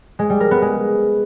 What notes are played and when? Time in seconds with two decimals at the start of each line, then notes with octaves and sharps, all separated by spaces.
0.19 G#3
0.30 G3
0.40 A#4
0.51 B3
0.62 G#3